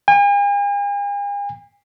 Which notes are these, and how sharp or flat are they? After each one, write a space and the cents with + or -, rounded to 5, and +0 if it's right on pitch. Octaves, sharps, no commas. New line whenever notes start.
G#5 -45